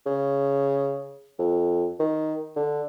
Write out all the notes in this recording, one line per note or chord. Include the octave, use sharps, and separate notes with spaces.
C#3
F2
D#3
D3